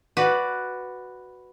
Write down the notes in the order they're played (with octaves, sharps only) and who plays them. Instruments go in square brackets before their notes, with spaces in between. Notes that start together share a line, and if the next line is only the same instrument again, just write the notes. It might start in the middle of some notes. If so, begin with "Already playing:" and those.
[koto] F#4 B4 D5